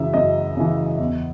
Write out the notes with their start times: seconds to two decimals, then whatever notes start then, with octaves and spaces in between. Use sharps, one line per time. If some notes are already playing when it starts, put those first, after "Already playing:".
Already playing: F#2 C#3 E3 E5
0.14 F#2 D#5
0.57 C#3 E3
0.99 E2